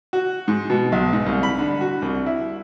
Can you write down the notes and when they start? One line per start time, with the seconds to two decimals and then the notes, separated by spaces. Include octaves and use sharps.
0.13 F#4
0.48 G#2
0.70 B2
0.92 B1
1.13 G#2
1.26 C2
1.43 B5
1.58 D3
1.81 F#4
2.02 C2
2.26 E4